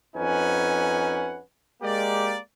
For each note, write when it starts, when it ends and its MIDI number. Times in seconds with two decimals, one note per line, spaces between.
0.16 1.40 41
0.16 1.40 61
0.16 1.40 63
0.16 1.40 71
0.16 1.40 78
0.16 1.40 80
1.83 2.38 56
1.83 2.38 58
1.83 2.38 67
1.83 2.38 70
1.83 2.38 74